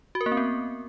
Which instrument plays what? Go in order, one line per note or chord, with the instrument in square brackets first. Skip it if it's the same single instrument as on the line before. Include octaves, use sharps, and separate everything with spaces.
[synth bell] F#4
A#4
A#3
C4
B3